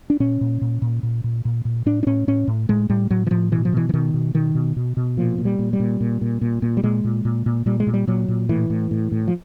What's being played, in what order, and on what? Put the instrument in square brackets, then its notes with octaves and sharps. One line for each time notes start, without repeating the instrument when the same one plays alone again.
[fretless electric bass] D4
A#2 C#4
A#2
A#2
A#2
A#2
A#2
A#2
A#2
A2 D4
D4
A2 C#4
A2 C#4
A2
A2 G#3
A2 G3
A2 F#3
E3
A2 F3
B2 E3
F3
B2 E3
E3
B2 D#3
B2
B2 D#3
B2
B2
B2
A#2 F3
A#2
G3
A#2
G3
A#2
A#2
A#2
A#2
A#2
G3
A#2 G#3
A#2
A#2
A#2
A#2 G3
G#3
A#2
G3
A#2 F#3
A#2
A2 E3
A2
A2
A2
F3